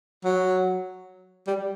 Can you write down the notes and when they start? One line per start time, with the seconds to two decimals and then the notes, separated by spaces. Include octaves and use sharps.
0.24 F#3
1.47 G3